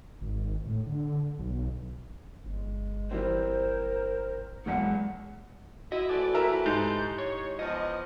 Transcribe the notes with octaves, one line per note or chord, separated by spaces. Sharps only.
G#1
A2
D3
B1
G1 G#3
E3 G3 C4 A#4 C5
B1 E2 E3 G#3 A#3 F#5
E4 F#4 D#5
E3 F3 A3 D5
E4 A#4 E5
G#2 E4 G4 G6
C#5
E2 F3 D#5 C#7